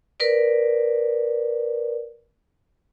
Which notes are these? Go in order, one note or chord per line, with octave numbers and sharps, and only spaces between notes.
A#4 B4 D5